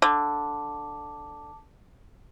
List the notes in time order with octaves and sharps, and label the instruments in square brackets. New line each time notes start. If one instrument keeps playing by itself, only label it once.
[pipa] D3 [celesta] A5 D6